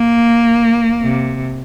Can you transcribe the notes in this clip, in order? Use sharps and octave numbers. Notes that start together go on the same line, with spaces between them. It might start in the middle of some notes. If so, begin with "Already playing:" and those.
Already playing: A#3
C3